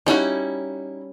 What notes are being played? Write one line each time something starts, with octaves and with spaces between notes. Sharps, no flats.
G3 C#4 D#4 E4 F#4